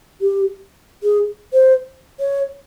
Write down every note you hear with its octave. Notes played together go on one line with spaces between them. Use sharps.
G4
G#4
C5
C#5